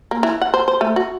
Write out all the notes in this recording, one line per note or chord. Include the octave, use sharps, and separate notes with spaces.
A#3
E3
F#5
C5
C5
A3
F#4